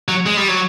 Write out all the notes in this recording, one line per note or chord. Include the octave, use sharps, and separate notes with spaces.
F#3
G#3
G3
F#3